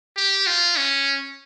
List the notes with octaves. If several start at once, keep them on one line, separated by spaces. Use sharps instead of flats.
G4
F4
C#4